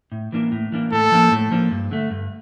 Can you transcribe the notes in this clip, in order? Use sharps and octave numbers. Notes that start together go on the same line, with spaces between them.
A2
E3 A#3 D4
A2
E3 A#3 D4
A2 A4
F3 A#3 D4
A2
F3 A#3 D4
G2
D3 A3
G2